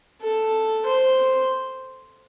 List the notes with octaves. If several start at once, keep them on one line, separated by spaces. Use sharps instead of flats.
A4
C5